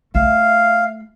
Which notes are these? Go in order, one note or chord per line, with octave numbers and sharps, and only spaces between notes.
A3 E5 F5